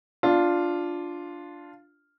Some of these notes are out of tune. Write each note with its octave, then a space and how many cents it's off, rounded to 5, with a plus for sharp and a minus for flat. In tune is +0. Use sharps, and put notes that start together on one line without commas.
D4 +0 F4 +0